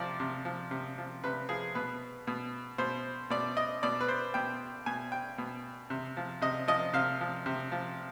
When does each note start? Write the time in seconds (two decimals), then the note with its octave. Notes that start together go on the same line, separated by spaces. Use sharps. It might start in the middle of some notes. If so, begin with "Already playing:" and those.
Already playing: C3 F3 D5
0.20 C3
0.45 F3
0.71 C3
0.98 F3
1.24 C3 B4
1.49 F3 G#4
1.75 B2 B4
2.27 B2
2.78 B2 C5
3.30 B2 D5
3.57 D#5
3.83 B2 D5
4.01 B4
4.08 C5
4.34 B2 G5
4.86 B2 G#5
5.12 G5
5.38 B2
5.90 C3
6.17 F3
6.42 C3 D#5
6.68 F3 D#5
6.93 C3 F5
7.21 F3
7.46 C3
7.72 F3